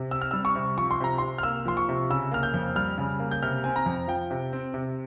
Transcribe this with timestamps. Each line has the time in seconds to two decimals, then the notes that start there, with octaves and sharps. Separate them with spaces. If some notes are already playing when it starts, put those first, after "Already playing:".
Already playing: C3
0.11 C4 E6
0.22 F6
0.31 G3 E6
0.45 C#6
0.55 C3
0.77 F3 C#6
0.91 C6
1.00 C3 A#5
1.18 C3 C6
1.38 F6
1.43 A#3 E6
1.65 F3 C6
1.77 C#6
1.89 C3
2.10 C#3 E6
2.31 A#3 F6
2.43 G6
2.54 F2
2.76 G3 F6
2.98 C#3
3.20 A#3
3.31 G6
3.43 C3 F6
3.64 C4 G#5
3.76 A#5
3.86 F2
4.08 F3 G5
4.31 C3
4.53 C4
4.74 C3